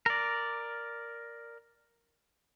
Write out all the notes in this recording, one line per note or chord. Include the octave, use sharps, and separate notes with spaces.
A#4 D5